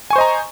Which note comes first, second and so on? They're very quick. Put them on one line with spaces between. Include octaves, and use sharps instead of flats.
G#5 C#6 C5 D#5 A#5